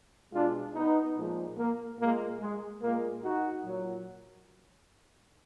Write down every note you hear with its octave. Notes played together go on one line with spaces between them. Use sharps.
B2 G#3 D4 F4
B3 D#4
A#2 F3 G#3
A#3
A#2 G#3 A#3
G#3
A#2 G#3 A#3
D#4 F#4
A#2 F#3